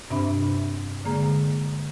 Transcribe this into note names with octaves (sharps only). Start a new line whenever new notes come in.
G2 C3 C4 D4 E5 B5
D3 G#3 A#3 G#4 A#5 F6